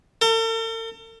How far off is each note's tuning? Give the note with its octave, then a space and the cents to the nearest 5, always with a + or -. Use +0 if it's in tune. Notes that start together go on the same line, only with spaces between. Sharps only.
A4 +45